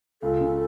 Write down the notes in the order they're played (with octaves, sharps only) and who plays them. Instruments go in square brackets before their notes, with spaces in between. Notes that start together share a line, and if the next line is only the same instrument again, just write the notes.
[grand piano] C#2 [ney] A4
[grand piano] C#3